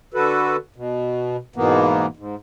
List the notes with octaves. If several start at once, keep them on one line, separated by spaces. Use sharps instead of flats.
D3 F#4 A4 B4
B2
G#2 B2 E3 A#3 B3
G#2